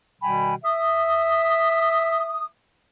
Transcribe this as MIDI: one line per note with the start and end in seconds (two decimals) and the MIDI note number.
0.22 0.55 47
0.22 0.55 51
0.22 0.55 55
0.22 0.55 79
0.22 0.55 80
0.22 0.55 83
0.64 2.45 76
0.64 2.45 87